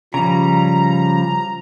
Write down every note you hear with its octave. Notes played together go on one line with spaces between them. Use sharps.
C#3 F3 G3 A#5